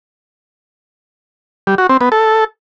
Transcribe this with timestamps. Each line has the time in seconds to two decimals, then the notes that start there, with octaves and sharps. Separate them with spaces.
1.67 G3
1.78 F#4
1.89 C4
2.01 B3
2.12 A4